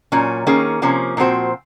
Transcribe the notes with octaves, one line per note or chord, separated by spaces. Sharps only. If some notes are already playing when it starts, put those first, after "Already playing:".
A#2 F#3 C#4
D#3 A#3 C#4 G#4
C3 F3 A#3 C#4
A#2 F3 C4 F#4 C5